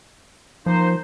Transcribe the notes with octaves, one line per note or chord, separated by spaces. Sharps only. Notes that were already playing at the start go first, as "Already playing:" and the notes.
F3 A#3 D#4 C5